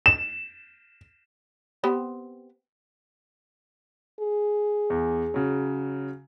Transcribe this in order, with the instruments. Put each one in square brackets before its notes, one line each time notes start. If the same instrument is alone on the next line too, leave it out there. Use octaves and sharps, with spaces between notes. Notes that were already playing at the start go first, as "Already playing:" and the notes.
[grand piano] E7
[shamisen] B3 C4 G4
[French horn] G#4
[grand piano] E2
C#3 F#3